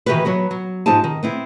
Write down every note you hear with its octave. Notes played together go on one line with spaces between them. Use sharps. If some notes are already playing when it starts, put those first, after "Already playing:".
D#3 E3 F#4 G4 B4
F#3 B3 F#4
F#3
G#2 F3 C4 D#4 G4 A5
D#3
B3 C4 E4